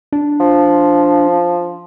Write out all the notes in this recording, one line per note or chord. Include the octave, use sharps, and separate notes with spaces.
D4
F3